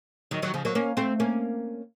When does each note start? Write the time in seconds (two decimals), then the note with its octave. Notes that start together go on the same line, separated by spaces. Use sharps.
0.31 D#3 F#3
0.42 D#3 F#3
0.54 C#3 F3
0.65 F#3 A#3
0.75 A#3 C#4
0.97 A3 C4
1.20 A#3 C#4